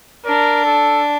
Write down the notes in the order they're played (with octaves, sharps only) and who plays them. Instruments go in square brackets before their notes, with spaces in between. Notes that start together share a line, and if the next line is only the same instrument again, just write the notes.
[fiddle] D4 [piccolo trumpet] A#4
[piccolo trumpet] A4